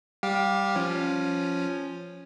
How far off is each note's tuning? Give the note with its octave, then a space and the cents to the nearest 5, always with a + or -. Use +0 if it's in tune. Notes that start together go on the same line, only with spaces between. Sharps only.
G3 +0 G4 +0 F5 +25
F3 +0 C#4 +0